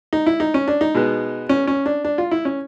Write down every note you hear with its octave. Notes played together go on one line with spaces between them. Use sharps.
D#4
E4
D#4
C#4
D4
D#4
B2 G#3 B3
C#4
C#4
D4
D4
F4
E4
C#4